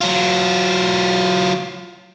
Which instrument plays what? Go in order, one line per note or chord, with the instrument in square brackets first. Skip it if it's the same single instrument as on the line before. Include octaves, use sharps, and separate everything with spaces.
[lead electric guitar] F#3 F4